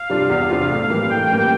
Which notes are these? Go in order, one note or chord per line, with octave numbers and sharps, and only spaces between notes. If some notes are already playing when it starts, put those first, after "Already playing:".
Already playing: F5
C3 G3 D4 F4
E2 F5
C3 G3 D4 F4
A2 F5
E3 G3 A#3
A2 G5
E3 G3 A#3